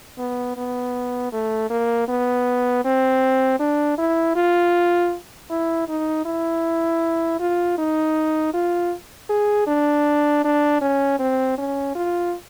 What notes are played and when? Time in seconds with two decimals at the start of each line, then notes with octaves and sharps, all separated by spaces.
0.18 B3
0.57 B3
1.33 A3
1.70 A#3
2.08 B3
2.85 C4
3.60 D4
3.98 E4
4.36 F4
5.50 E4
5.88 D#4
6.25 E4
7.40 F4
7.78 D#4
8.54 F4
9.30 G#4
9.67 D4
10.44 D4
10.82 C#4
11.19 C4
11.58 C#4
11.95 F4